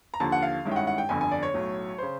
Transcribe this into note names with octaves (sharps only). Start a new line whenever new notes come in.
A#5
D#2 D3 F3 A5
F#5
F5
G2 D#3 G#3 C#4 E4
G5
F#5
F#5
G5
G1 F2 D3 G#5
G#5
D5
C#5
B1 A2 F#3
C#3 C5